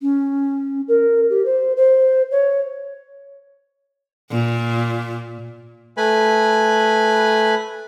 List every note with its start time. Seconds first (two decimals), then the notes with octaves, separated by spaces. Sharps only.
0.01 C#4
0.88 A#4
1.30 G4
1.45 C5
1.77 C5
2.31 C#5
4.31 A#2
5.97 A3 B4 G#5 B5